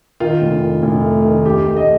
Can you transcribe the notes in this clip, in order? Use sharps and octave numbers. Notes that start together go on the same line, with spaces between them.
D#3 F4
F1
D#3
F1
A3
D#3
D2 G4
A3
D#5